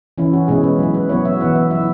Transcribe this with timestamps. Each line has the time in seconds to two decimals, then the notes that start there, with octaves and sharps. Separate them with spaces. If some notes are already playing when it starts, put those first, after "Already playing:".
0.18 E3 C#4 E4
0.33 F#4
0.48 B2 G#3 C#4 E4 G#4
0.64 B4
0.79 F#3 E4
0.94 B4
1.09 F#3 B3 E4 C#5
1.25 E5
1.40 E3 B3 E4 F#5
1.55 E5
1.71 F#3 E5
1.75 E4